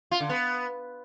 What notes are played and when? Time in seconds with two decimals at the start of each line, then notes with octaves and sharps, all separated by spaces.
0.11 F4
0.20 D3
0.29 B3